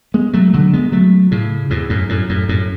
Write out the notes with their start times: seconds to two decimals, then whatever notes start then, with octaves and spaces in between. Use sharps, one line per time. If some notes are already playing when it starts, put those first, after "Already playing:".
0.14 G#3 B3
0.33 F#3 A3
0.53 D3 F#3
0.73 G#3 B3
0.92 F#3 A3
1.31 A2 C#3
1.70 E2 G#2
1.89 F#2 A2
2.09 F#2 A2
2.29 F#2 A2
2.49 F#2 A2